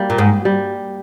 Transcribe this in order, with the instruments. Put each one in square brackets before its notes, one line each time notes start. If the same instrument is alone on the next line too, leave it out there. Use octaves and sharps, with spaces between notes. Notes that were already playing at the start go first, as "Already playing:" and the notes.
Already playing: [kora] G3 A#3
[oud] A#2
G#2
[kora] G3